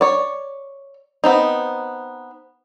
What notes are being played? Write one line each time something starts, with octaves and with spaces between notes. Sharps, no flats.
C#5 D5
B3 C4 D#4